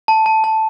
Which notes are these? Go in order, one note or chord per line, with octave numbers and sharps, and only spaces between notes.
A5
A5
A5